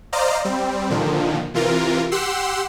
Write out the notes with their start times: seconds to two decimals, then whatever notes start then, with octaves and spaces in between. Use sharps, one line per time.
0.13 C5 D5 D#5 F5 A#5
0.45 G3 C4
0.90 A#2 D3 D#3 F3
1.54 C3 E3 F4 A#4
2.12 G4 F#5 C6 E6